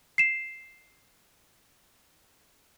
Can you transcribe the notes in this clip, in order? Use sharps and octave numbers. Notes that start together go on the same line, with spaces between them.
C7 E7